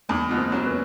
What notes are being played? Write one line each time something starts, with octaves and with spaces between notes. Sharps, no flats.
E2 G#3 A#3
B2
A#3 C4
F#3
B3 C#4